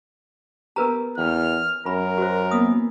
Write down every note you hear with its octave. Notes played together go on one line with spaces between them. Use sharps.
B3 G4 A#4 B4 A#5
E2 C#4 G5 F6
F#2 A#4 B5
F#4 C5
E3 A#3 B3 D#6